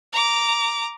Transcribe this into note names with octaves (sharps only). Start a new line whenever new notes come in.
A#5 D6